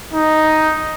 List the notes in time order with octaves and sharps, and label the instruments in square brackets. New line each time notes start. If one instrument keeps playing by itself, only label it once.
[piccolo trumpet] D#4